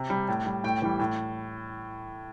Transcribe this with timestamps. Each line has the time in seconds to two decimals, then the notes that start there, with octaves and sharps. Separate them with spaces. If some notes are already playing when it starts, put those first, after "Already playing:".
Already playing: C3
0.10 G3
0.28 A2
0.46 G3
0.64 A2 G5
0.82 E3 G3
0.99 A2